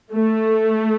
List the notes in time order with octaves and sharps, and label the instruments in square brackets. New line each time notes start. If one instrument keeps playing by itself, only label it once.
[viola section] A3